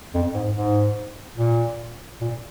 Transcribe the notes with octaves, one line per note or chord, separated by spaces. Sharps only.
F2
G#2
G#2
A#2
A#2